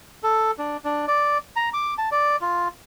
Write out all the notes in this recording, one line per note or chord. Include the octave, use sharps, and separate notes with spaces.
A4
D4
D4
D5
A#5
D6
A5
D5
F4